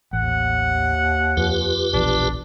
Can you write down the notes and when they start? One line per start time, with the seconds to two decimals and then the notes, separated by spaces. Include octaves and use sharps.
0.13 A1 D#2 F#5
1.37 F2 F4 G4 B4
1.93 E1 A#1 E2 D4